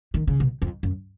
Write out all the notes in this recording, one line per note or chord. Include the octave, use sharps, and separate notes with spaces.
D#3
C#3
B2
F2
F#2